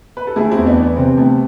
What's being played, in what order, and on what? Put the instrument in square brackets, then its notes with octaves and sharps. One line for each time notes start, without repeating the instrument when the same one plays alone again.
[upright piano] B4
A4
[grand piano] A3 [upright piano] E4 G#4
[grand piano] E2 [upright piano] C4 E4
[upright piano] B3 D4
[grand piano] E3
[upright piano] B3
[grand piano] C3 [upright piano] C4
[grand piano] A3 [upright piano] B3